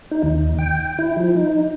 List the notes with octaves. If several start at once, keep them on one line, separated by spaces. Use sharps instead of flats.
D#4
D#2
G5
E4
F3
D#4